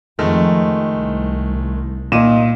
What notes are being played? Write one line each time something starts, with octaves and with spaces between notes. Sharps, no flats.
F2 D#3 G#3 A3
C2
A#2 D#4 D#7 E7